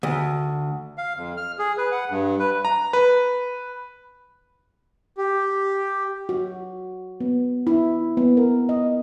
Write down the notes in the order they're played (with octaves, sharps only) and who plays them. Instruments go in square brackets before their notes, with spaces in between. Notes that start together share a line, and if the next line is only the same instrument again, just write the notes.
[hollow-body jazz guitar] D2
[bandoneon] F5
F2
F6
G#4
B4
F#5
G2
B4
[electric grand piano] A#5
B4
[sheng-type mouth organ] G4
[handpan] F#4
B3
E4
B3
A#4
D#5